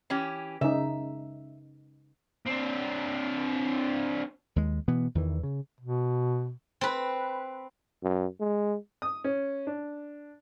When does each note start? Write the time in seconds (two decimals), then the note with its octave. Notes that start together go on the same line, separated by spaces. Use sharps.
0.10 E3 C#4 G4
0.61 C#3 D#4 E5
2.47 C4 D4
4.56 D#2 G#3
4.88 B2 E3 B3
5.15 E2 D#3 E3
5.43 C#3
5.80 B2
6.81 C4 B4
8.03 F#2
8.40 G#3
9.02 D#6
9.24 C#4
9.67 D4